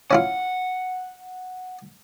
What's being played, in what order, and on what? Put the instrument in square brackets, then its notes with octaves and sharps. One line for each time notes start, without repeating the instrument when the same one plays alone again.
[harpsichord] C#4 E4 F4 [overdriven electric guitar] F#5